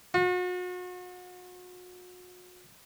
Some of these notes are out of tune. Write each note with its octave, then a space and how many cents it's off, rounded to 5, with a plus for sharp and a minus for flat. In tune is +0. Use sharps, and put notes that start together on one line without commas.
F#4 -40